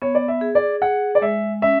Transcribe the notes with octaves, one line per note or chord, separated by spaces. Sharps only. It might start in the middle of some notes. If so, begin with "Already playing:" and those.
B3 C#5
D5
E5
G#4
D5
G#4 F#5
D5
G#3 E5
C#4 E5